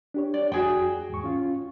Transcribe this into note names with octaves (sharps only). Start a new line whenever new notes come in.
D4 G4 C#5
D5
F2 F#4 G#4 G5 G#5
E2 G#2 C#6
C#4 F4